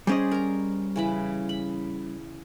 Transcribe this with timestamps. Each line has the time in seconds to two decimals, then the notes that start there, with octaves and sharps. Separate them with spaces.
0.07 G3 C#4 G#4 C5 D5 D#5
0.31 A#4 A#5
0.96 C#3 E3 B5
1.49 B5